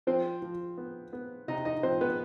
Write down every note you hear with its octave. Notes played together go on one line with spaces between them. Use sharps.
F3 C4 C5
F3
B3
B3
C3 D#4 D#5
D#4 D#5
F3 C4 C5
B3 B4